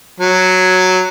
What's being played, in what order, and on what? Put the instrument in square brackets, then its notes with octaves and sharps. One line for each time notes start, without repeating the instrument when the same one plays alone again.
[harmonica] F#3